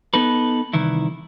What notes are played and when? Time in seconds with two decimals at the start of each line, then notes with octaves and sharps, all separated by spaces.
0.14 B3 D#4 A4 B4
0.73 C2 D#3 E3 E4